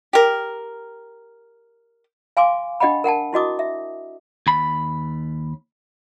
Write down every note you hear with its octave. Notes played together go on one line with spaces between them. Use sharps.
G4 A#4
F5 G#5 C6 D6
D4 G4 D#5 F#5 G5 B5
A#4 F#5 G5 A5
E4 F#4 D#5 D6 D#6
E5
D#2 B5